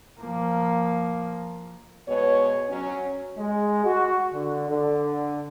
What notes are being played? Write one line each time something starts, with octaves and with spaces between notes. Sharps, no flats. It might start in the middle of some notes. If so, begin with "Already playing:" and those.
F3 A#3
B2 G#3 B3 C#5
F#3 C#4
G#3
F#4
D3
D3